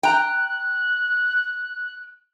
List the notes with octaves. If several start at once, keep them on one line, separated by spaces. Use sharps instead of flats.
G5 A#5 F#6